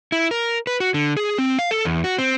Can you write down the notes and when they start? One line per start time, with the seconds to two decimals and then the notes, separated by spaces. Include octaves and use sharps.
0.12 E4
0.31 A#4
0.67 B4
0.80 F#4
0.94 D3
1.17 G#4
1.38 C4
1.59 F5
1.71 A4
1.85 E2
2.04 F#4
2.18 C4